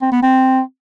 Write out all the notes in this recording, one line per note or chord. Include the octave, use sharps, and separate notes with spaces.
C4
B3
C4